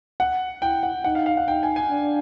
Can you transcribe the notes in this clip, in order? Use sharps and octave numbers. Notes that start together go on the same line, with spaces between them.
F#5
E4 G5
F#5
D#4 F#5
F5
F5
F#5
D#4 G5
G#5
G#5
D4